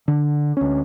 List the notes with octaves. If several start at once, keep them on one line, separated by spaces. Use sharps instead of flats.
D3
D2 C#4